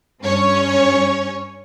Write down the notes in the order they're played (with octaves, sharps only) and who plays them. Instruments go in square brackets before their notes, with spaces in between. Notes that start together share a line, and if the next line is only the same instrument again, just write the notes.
[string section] G2 C#4 C#5